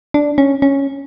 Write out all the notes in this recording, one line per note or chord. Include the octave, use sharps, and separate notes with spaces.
D4
C#4
C#4